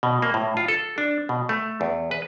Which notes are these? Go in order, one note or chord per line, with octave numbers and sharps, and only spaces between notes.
B2
A#3
A2
F4
A4
D4
B2
A3
E2
B4